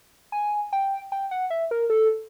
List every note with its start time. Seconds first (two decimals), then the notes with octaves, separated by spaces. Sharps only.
0.32 G#5
0.73 G5
1.12 G5
1.31 F#5
1.50 E5
1.71 A#4
1.90 A4